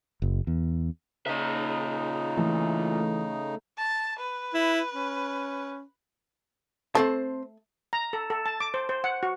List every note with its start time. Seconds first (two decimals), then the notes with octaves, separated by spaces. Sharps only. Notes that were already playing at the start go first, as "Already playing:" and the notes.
0.22 F#1
0.47 E2
1.26 A#2 C#3 D#4 E5
2.37 E3 A3
3.78 A5
4.20 B4
4.54 E4
4.94 C#4
6.95 A3 C4 C5 A5
7.93 A#5
8.13 A4
8.30 A4
8.46 A5
8.60 D6
8.74 C5
8.89 C5
9.04 F#5
9.23 F#4